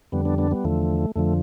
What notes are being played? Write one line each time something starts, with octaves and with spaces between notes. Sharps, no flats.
F2 D3 G3 B3
B3 D4
B3 D4
G3 B3
E2 D3 F3 A3
F2 D3 F3 A3